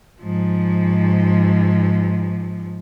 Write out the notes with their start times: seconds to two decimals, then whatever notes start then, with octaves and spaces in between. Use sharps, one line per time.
0.22 G#2 F3